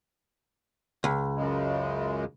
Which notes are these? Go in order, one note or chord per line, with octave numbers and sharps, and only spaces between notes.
C#2
F#2 C#3 G#3